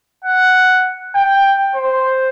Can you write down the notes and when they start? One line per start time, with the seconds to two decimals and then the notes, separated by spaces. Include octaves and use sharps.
0.24 F#5
1.15 G5
1.75 C5